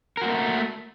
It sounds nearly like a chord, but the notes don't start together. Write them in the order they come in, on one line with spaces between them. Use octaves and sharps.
A#4 F#4 A#3 A3